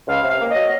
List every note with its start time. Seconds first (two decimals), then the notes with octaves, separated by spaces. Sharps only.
0.08 C#2 F5
0.23 C3
0.29 F5
0.40 A#3
0.50 D#5
0.55 F#3